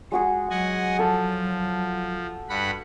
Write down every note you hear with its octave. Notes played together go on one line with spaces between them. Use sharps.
G#3 F#4 G#4 F#5
F#3 D#5 F#5 G#5
F3 A4
G2 F#5 B5